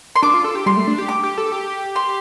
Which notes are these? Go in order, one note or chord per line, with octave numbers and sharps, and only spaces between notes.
C6
D4 D6
F4
A4
G4
G3 C6
A3
D4
G4
D6
G4
A4
G4
C6